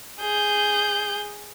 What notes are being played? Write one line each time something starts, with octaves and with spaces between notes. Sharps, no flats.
G#4 G6